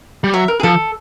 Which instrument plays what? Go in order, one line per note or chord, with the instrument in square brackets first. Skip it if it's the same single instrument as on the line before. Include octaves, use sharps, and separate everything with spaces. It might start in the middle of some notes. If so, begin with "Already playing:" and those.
[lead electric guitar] G3
[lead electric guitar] F#3 [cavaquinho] E5
[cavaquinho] A#4
G#4
[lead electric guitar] F3 [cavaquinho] A4